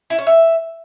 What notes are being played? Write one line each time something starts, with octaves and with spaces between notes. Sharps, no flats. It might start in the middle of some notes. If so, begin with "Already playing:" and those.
E4
C#4
E5